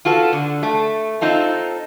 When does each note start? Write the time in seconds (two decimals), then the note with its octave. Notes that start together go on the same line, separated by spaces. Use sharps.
0.05 F4 F#4 A4 B4
0.33 D3
0.63 A3
1.21 C4 D#4 F4 A4